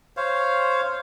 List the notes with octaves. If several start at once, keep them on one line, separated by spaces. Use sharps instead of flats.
C5 C#5 F5